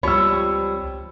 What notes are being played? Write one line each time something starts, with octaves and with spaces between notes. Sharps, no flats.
C#2 F3 G3 C4 C#5 B5 E6